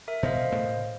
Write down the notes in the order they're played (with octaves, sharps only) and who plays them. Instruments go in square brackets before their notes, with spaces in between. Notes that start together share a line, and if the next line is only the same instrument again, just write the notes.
[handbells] A#4 E5
[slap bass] B2 G#3 [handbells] C5 D#5 F5
[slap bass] A2 C#3 A3